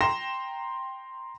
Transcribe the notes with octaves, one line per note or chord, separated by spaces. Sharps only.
G5 A#5 C6 A#6 E7